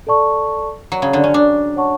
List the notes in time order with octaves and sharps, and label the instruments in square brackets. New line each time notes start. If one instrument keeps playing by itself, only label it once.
[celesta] A4 D5 A5 C#6
[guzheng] F#3
C#3
D3
C#4
D4
[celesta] C#5 F#5 A5 C#6